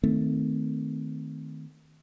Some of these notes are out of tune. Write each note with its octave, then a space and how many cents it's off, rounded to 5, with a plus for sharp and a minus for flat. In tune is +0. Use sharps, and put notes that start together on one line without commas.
D#3 +0 A3 +0 C4 -25